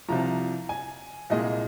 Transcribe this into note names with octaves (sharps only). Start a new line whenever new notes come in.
C2 C3 F3 A#5
G#5
C2 A#2 G#3 D#5